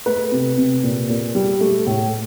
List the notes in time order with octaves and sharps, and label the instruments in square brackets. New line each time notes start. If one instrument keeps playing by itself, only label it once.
[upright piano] A3 B4
C3
C3
A#2
A#2
G3
A3
A2